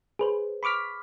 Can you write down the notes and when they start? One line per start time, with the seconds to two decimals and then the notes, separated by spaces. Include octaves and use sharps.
0.19 G#4 B4 C5
0.63 B5 C#6 D6 F6 B6